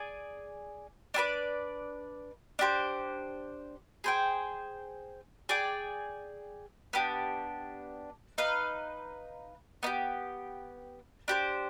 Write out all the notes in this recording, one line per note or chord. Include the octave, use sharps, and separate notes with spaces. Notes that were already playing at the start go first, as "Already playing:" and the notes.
Already playing: G#4 D5 G#5
D4 G#4 B4 D5
D4 G4 C5
G#4 C5 G5
G#4 D5 G5
B3 D4 G4
D#4 B4 F5
B3 D#4 G4
D4 G4 C5